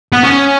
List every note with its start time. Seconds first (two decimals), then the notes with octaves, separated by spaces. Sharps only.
0.13 B3
0.23 C#4